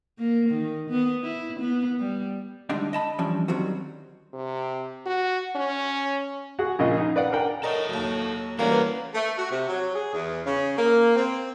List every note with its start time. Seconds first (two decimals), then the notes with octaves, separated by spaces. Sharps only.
0.18 A#3
0.49 D#3
0.90 B3
1.23 E4
1.59 B3
2.00 G3
2.69 A2 D3 G3 G#3 D4 D#4
2.93 D#5 A5 B5
3.18 E3 F3 G3 C#4 D4
3.48 D#3 F#3 G3 C4 F#4
4.33 C3
5.06 F#4
5.56 C#4
6.59 F#4 G#4 F#5
6.79 A#1 C#3 F4 D#5
6.98 D#4
7.16 B4 D5 F5 F#5
7.32 D4 A#4 F#5 G5
7.63 A4 A#4 C#5 D#5
7.89 D#2 F#3
8.59 E3 G3 A3 A#3 C#4 F#4
8.71 B4
9.14 A3
9.37 F#4
9.50 C3
9.69 F#3
9.95 G#4
10.13 E2
10.45 C#3
10.76 A#3
11.15 C4